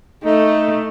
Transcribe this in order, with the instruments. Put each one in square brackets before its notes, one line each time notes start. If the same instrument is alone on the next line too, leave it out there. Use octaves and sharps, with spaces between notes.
[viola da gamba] A3 [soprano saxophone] D#4